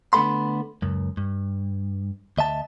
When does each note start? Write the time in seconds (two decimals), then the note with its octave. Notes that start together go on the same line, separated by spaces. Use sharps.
0.13 D3 A3 B3 A4 B5 C6
0.82 C#2 F#2
1.17 G2
2.38 D2 D#5 E5 A5